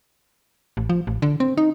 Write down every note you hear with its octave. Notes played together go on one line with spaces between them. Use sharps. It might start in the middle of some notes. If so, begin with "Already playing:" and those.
A1
F3
A1
D3
C4
D#4